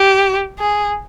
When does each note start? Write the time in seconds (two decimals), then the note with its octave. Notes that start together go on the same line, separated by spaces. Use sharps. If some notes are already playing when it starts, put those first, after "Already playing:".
Already playing: G4
0.59 G#4